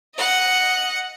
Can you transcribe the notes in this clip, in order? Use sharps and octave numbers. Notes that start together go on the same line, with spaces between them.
D#5 F#5